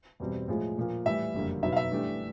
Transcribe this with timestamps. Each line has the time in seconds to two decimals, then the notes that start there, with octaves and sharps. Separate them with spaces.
0.20 E2 B2 G3 C4
0.48 A2 F3 G#3
0.78 A#2 F3 A#3
1.06 A2 E3 G3 E5
1.34 F#1 F2 D3 G3 A#3
1.62 B2 F#3 B3 D#4 E5
1.72 F5
1.77 E5
1.91 G2 E3 A3 D4 G4